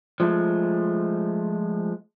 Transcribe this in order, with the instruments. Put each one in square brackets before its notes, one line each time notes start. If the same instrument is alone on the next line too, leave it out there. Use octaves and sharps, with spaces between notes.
[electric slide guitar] F3 G#3 A3